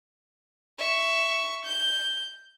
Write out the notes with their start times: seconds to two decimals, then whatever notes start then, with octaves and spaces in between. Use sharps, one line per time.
0.78 E5 C#6
1.65 G6